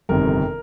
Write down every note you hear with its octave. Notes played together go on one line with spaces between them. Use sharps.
G1 F2 C3 D#3 A#4